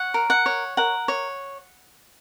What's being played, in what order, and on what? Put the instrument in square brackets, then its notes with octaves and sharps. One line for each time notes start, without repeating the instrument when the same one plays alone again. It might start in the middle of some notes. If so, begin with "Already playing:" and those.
Already playing: [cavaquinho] C#5 F#5
A#4
F#5
C#5
A#4 F#5
C#5